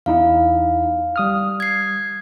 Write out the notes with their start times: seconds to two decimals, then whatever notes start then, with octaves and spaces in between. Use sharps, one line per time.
0.06 E2 D#4 E4 F5
1.16 G3 D#6 F6
1.60 G#6 C7